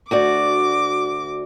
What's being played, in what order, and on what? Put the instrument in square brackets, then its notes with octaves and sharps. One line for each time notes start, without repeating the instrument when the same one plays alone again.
[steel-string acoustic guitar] D2 F#4 D5 [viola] D6